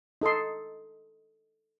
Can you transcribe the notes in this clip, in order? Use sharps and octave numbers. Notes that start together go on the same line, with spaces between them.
D#4 A4 D#5 C6